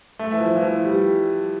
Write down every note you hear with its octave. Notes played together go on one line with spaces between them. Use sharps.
A3
E3
F3
E3
F3
G3